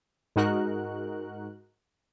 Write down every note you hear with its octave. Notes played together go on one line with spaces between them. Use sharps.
G#2 G#3 D#4 F#4 A#4 F#6